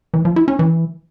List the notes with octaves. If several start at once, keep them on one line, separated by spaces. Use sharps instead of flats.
E3
F3
E4
C#4
E3